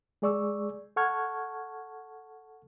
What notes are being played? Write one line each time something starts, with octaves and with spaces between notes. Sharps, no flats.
G#3 G#4 D5 C#6 E6
A4 F#5 A5 C#6 F6 G#6